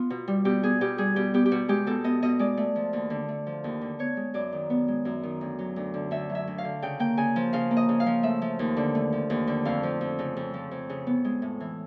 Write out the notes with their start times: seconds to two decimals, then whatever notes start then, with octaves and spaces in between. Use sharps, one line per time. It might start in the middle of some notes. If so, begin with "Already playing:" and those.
Already playing: B3 F4
0.10 B2
0.28 G3
0.45 B2 G4
0.63 B3 G#4
0.81 B2 G4
0.98 G3 G#4
1.16 B2 G4
1.34 B3 G4
1.46 G4
1.52 B2 F#4
1.69 G#3 G4
1.87 B2 A4
2.04 B3 D#5
2.22 B2 D#5
2.39 G#3 D5
2.57 A3
2.76 F3
2.93 D#2
3.10 D3
3.29 A3
3.46 F3
3.64 D#2
3.81 D3
3.99 B3 C#5
4.17 G#3
4.34 F#2 D5
4.52 D#3
4.70 B3
4.88 G#3
5.05 F#2
5.23 D#3
5.41 D2
5.59 F#3
5.76 D2
5.94 D3
6.11 D2 E5
6.30 F#3
6.35 E5
6.47 D2
6.58 F5
6.64 D3
6.82 C#3 G5
6.99 A#3 G5
7.17 C#3 G#5
7.36 F3
7.53 C#3 F5
7.71 A#3
7.77 D#5
7.89 C#3
8.00 F5
8.06 F3
8.23 A3 E5
8.42 F3
8.59 D#2
8.77 D3
8.95 A3
9.13 F3
9.30 D#2
9.47 D3
9.65 F2 F5
9.83 F3
10.01 F2
10.19 C#3
10.37 F2
10.54 F3
10.71 F2
10.89 C#3
11.07 B3
11.25 G#3
11.42 A2
11.60 E3